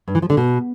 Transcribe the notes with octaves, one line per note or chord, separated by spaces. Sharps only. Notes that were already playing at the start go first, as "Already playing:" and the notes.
G2
E3
F3
D3
B2